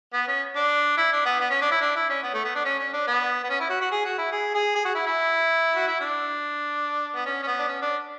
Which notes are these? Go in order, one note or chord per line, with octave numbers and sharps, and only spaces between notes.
B3
C#4
D4
E4
D4
B3
B3
C#4
D4
E4
D4
E4
C#4
B3
A3
B3
D4
C#4
C#4
D4
B3
B3
C#4
E4
F#4
F#4
G#4
F#4
E4
G#4
G#4
G#4
F#4
E4
E4
F#4
E4
D4
B3
C#4
C#4
B3
D4
C#4
D4